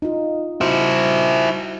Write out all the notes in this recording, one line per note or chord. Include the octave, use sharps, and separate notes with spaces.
D#4 F4
E4 F#4 C5